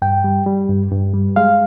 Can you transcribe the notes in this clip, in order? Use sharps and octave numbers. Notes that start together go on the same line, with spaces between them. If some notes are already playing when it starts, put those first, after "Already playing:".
G2 G5
G3
G3
G2
G2
G3
G#3 F5